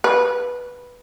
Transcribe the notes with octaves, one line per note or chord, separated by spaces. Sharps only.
B4